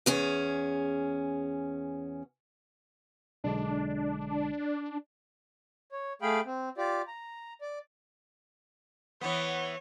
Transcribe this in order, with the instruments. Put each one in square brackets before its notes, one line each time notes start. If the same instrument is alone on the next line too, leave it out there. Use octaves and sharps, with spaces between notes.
[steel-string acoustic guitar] E2 C#4 G#4
[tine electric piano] B1 D3 G#3 [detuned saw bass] D4
[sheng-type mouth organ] C#5
A3 G#4 F5 G5 B5
C4
F4 G4 D5
A#5
D5
[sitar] E3 B3 [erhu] C#5